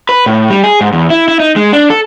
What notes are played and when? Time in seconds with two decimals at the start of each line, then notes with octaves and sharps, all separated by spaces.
0.09 B4
0.26 A2
0.50 G3
0.64 G#4
0.81 G#2
0.93 E2
1.10 E4
1.28 E4
1.40 D#4
1.56 G#3
1.73 D4
1.90 A4